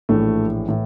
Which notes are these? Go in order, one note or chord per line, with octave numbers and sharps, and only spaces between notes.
A#1 A2 E3 A3
A2 E3